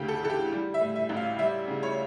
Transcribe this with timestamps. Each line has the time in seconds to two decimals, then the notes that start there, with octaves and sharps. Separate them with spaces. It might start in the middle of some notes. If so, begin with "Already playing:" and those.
Already playing: D2 C#3 G4
0.08 A4
0.23 E3 A4
0.30 G4
0.52 G3
0.74 E5
0.81 A2
0.95 E5
1.09 A1
1.17 F5
1.39 G3 E5
1.68 C#3
1.83 C#5